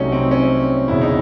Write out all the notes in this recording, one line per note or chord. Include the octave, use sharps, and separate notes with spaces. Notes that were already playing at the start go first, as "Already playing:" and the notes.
Already playing: C2 C3 F#3 A3 C#4 D#4
C4
C#4
E1 E2 C#3 E4
D#4